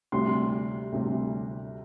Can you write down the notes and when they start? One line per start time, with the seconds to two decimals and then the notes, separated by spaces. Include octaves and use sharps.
0.12 D2 C3 G3 C6
0.92 D2 C3 G3